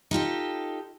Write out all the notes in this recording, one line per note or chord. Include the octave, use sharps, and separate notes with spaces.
D#4 F4 G4 A4